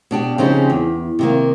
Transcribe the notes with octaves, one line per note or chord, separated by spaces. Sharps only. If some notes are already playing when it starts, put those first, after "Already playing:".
B2 D4 G4
C#3 F3 C4 C#4 D#4 G4
E2
C3 D#3 A#3